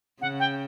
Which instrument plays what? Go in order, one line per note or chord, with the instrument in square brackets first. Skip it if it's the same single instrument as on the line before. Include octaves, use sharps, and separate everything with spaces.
[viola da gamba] C#3 [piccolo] F#5
[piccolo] G5